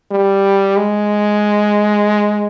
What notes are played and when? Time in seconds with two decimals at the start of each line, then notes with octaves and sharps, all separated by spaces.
0.11 G3
0.77 G#3